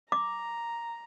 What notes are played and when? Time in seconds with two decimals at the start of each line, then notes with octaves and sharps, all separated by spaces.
0.12 A#5 D6